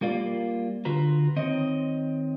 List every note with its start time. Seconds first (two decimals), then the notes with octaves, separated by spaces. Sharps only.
0.01 G3 A#3 F4 D5
0.85 D3 F4 F#4 B4 A#5
1.36 D#3 C4 C#5 D#5